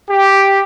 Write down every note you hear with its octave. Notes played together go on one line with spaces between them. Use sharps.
G4